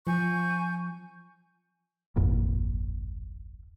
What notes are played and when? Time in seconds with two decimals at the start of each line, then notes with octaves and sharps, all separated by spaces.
0.07 F3 G#5 C#6 G6
2.16 D1 G#1 F2 A#2